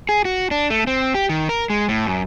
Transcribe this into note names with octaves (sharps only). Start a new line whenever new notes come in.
G#4
F#4
D4
A3
C4
G4
D#3
A#4
G#3
A2
F#2